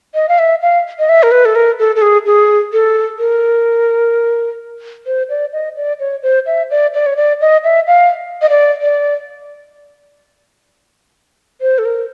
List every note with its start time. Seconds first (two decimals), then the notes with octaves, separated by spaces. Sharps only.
0.15 D#5
0.29 F5
0.39 E5
0.62 F5
0.99 D#5
1.09 E5
1.23 A#4
1.31 B4
1.45 A4
1.55 A#4
1.79 A4
1.96 A4
2.02 G#4
2.26 G#4
2.73 A4
3.19 A#4
5.07 C5
5.29 D5
5.53 D#5
5.77 D5
6.00 C#5
6.23 C5
6.46 E5
6.71 D5
6.94 D5
7.06 C#5
7.17 D5
7.41 D#5
7.64 E5
7.87 F5
8.42 D#5
8.50 D5
8.82 D5
11.61 C5
11.79 A4
11.85 A#4